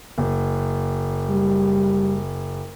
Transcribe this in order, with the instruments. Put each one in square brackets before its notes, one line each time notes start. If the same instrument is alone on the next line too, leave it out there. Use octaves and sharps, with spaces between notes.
[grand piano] F#1
[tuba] G3